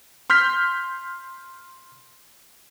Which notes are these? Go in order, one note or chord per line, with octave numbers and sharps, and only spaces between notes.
C6 F6 G6 B6